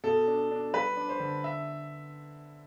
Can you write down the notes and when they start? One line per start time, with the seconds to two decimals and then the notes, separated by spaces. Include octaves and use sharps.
0.04 B2 A4
0.27 D4
0.51 D4
0.73 G3 B4
0.97 D4
1.09 C5
1.20 D3
1.44 E5